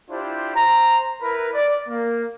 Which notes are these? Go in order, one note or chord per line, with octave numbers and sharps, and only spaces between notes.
D4 E4 F4 G4 C5
C5 A#5
E4 A#4 B4
D5
A#3